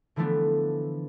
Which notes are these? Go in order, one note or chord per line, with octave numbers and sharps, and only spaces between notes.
D3 E3 F3 A3 B3 D4